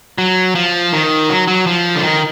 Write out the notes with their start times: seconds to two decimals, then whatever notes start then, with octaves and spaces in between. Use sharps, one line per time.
0.18 F#3
0.55 F3
0.92 D#3
1.29 F#3
1.48 F#3
1.67 F3
1.95 D3
2.04 D#3